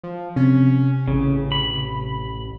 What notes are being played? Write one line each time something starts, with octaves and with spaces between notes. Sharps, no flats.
F3
C3 C#4
A1 C#3
B5